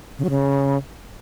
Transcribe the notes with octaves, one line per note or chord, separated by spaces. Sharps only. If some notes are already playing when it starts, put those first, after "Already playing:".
C#3
F#3
C#3